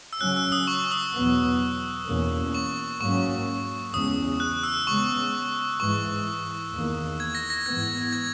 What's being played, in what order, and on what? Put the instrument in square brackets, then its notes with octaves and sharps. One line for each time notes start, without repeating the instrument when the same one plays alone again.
[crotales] E6
[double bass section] C#3 F#3 C#4 [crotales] F#6
[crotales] E6
D#6
C#6
D#6
[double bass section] E2 B2 F#3 B3
E2 B2 A#3 C#4
[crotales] C#6
[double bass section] G#2 F#3 A#3 C#4 [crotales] C#6
[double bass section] E2 C#3 G#3 C#4 [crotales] D#6
[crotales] F#6
E6
[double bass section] C#3 G#3 B3 [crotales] C#6
[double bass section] G#2 E3 G#3 [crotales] C#6
[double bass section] E2 D#3 A#3
[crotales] G#6
A#6
A#6
[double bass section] G#2 E3 B3 [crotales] G#6
[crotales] G#6